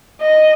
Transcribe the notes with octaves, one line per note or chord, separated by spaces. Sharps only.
D#5